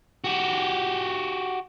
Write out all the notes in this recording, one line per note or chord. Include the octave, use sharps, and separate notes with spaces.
F#4 G4